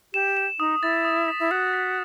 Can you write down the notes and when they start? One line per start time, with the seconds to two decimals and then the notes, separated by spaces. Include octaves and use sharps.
0.13 G4 E7
0.37 E7
0.59 D#4 D#6
0.82 E4 A6
1.05 D#6
1.28 B6
1.40 E4
1.51 F#4 D#6
1.73 B6